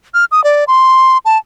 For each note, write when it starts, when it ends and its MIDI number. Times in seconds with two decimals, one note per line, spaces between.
0.14 0.25 89
0.32 0.43 87
0.44 0.64 74
0.68 1.18 84
1.25 1.38 81